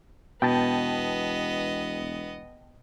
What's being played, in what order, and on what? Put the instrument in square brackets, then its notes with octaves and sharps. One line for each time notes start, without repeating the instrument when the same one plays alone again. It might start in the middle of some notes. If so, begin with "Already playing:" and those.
[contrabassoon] E1 [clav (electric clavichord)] B2 [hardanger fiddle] B3 D#5 [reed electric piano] G5 A5